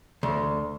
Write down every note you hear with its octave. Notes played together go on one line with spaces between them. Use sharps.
D2